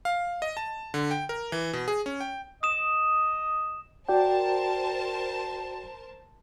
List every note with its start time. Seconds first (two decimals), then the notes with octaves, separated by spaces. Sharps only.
0.05 F5
0.42 D#5
0.57 A5
0.94 D3
1.11 G5
1.29 A#4
1.52 E3
1.73 B2
1.88 G#4
2.06 C#4
2.20 G5
2.63 D#5 D#6 E7
4.09 F#4 A#4 C5 D5 G5 A5